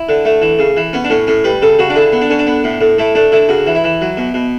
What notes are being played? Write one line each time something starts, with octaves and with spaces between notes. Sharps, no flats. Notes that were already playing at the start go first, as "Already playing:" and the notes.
Already playing: E4
D3
A3
E3
C#3
E3
B3 C#4
D4
A2 C#4
A2 C#4
G3 B4
C#3 A4
C#3 F#4
D4
D3 E4
B3
D4
D3 C#4
D4
B3
A2
A2
A3 E4
A3 D4
D3 E4
C#3 F#4
E3
E4
E3
F#3
B2
B2